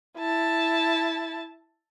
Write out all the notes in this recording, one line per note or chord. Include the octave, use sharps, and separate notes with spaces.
E4 A5